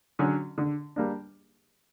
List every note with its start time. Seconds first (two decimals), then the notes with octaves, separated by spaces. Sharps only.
0.19 D3 F#3 C#4
0.58 D3
0.96 G3 A#3 D4